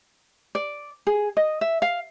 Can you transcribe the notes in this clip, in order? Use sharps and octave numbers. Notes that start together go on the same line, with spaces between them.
D5
G#4
D#5
E5
F5